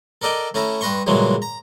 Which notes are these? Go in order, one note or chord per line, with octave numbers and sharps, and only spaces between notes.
A4 A#4 D5 D#5 G5
A3 C#4 E4 A#5
G2 B4 A#5 C6 C#6
G2 A#2 C#3 E3 F#3 G#3
A#5